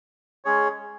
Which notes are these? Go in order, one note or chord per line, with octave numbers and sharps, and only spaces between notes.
G#3 C#4 G#4 C#5